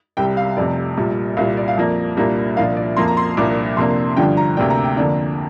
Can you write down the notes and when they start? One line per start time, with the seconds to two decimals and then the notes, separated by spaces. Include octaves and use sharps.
0.17 C2 C3 G3 G5
0.37 F5
0.57 F1 F2 C3 D5
0.97 A#1 A#2 G3
1.37 C2 A#2 G3 F5
1.57 D5
1.68 F5
1.77 F2 F3 A#3 D5
2.17 C2 A#2 G3 A#3 D4
2.57 C2 A#2 F3 D4 F5
2.77 D5
2.97 F2 F3 A#3 C6
3.08 A#5
3.17 C6
3.37 C2 A#2 F3 A#3 D4 D6
3.77 F2 C3 A#3 D4 C6
4.17 G2 D3 F3 D4 G5
4.37 A#5
4.57 D2 C3 A#3 D4 G5
4.70 A#5
4.84 G5
4.97 F2 D3 A#3 D4